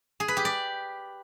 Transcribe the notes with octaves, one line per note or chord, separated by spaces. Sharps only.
G#4
B4
G4
D5